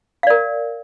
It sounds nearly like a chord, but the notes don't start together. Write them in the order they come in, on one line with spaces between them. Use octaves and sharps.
F5 D5 A#4